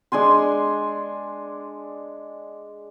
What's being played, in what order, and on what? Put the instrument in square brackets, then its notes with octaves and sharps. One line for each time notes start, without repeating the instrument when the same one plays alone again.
[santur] G#3 D4 G#5 C6